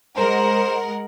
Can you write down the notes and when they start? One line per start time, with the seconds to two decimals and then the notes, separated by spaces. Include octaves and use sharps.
0.17 G#3 A#4 C5 F#5